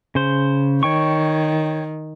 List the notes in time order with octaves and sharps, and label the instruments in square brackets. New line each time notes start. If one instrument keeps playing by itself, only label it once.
[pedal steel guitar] C#3 C5
[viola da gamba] D#3 [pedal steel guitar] C#5 G5 C#6